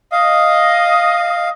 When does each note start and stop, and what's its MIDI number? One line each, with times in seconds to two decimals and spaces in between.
0.12 1.51 75
0.12 1.49 77